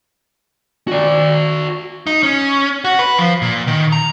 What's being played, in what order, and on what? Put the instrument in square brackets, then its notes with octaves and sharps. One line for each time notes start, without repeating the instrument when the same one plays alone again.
[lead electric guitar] F#4 D5
D#4
C#4
F#4
B4
F3
A#2
D#3
A#5